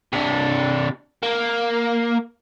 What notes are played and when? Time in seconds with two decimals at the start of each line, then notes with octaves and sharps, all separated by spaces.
0.13 C3 D4
1.23 A#3